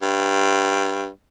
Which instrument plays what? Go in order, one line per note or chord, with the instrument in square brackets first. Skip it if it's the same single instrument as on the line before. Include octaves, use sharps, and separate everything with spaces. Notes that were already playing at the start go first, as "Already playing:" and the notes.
[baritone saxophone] G2